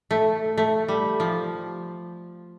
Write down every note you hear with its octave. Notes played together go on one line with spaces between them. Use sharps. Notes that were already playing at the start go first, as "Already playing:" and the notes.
A3
A3
G3
F3